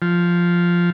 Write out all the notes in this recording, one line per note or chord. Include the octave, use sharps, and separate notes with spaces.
F3